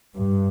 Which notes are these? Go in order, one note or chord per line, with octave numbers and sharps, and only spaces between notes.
G2